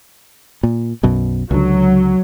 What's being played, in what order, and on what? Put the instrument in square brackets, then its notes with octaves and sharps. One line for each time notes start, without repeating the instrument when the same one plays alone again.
[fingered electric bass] A#2
B1 F#2 B2
[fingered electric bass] C#2 D3 [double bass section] F#3